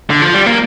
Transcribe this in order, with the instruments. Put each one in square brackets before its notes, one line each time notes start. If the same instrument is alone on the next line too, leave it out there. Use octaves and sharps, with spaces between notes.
[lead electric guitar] D3
F3
G3
A#3